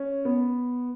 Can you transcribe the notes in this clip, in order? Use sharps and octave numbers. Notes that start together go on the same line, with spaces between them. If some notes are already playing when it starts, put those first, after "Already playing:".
Already playing: C#4
B3